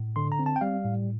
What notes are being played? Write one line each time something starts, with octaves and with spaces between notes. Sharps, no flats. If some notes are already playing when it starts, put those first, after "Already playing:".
Already playing: A2
D3 C6
A#5
C4
A5
G5
G3 F5
A2